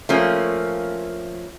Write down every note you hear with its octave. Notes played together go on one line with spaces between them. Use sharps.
F3 A3 A#3 C#4